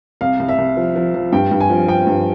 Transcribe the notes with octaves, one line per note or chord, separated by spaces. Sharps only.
C2 F5
C2
E5
C2
F3
F3
F3
G2 G5
G2
G#5
F3
F3 G5
G2